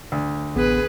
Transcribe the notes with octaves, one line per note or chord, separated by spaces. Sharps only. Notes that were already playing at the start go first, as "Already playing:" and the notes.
D2
A1 B3 G#4 B4